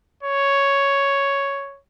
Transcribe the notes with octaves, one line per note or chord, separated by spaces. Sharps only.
C#5